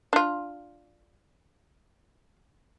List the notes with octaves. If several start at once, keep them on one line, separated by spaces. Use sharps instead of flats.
D4 F4